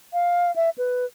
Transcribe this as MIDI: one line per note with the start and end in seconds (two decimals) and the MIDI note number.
0.13 0.54 77
0.56 0.70 76
0.78 1.05 71